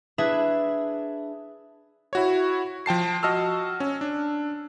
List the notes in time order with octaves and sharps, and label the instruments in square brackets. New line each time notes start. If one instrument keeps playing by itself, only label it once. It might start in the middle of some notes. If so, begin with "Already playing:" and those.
[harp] D4 E4 G#4 B4 E5
[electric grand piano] E4 F#4 C#5
F3 G5 A5 C7
F#4 D#5 A5 E6 F6
C#4
D4